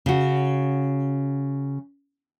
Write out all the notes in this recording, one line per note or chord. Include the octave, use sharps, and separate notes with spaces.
C#3 F#4